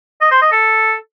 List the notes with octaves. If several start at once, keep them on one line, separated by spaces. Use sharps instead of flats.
D#5
C5
D#5
A4